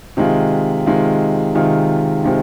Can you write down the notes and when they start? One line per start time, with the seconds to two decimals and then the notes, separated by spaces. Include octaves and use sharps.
0.17 C3 D#3 G#3 F4
0.86 C3 D#3 G#3 F4
1.55 C3 D#3 G#3 F4
2.24 C3 D#3 G#3 F4